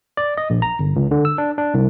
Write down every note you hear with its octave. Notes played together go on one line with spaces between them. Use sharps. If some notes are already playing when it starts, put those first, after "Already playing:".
D5
D#5
A#1
A#5
G1
C#2
D3
E6
D4
D4
C2